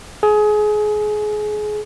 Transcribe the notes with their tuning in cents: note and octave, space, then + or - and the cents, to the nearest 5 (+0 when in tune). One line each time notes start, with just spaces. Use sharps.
G#4 +25